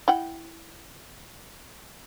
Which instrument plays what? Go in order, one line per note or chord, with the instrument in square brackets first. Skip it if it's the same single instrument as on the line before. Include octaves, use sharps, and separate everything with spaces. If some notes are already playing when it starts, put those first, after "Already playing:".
[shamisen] E4 F#5 G5